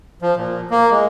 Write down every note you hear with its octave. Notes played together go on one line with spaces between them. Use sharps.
F3
A#2
A#3
G#3